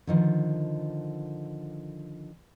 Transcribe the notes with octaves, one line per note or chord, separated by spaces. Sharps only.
D3 D#3 F3